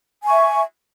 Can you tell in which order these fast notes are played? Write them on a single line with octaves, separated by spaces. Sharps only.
G#5 C#6 E5